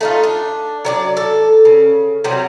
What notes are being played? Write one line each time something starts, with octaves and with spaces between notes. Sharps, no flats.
A3 D#4 F4
D4
F#3 C#5 D5
A4
C#3
C3 F#3 G3 B3